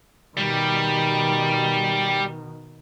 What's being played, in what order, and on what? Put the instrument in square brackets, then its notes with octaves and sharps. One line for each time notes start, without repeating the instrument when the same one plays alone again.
[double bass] B2 D#3 [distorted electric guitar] G3